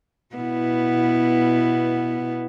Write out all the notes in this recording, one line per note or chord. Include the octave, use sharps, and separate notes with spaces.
B2 B3 E4